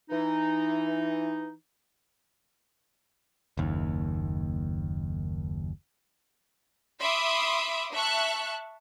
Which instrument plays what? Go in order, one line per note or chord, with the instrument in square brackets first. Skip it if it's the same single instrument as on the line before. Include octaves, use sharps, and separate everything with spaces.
[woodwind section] E3 D#4
[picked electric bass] F#1 D#2
[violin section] E5 B5 C6 D6 D#6
E5 A5 C#6 F#6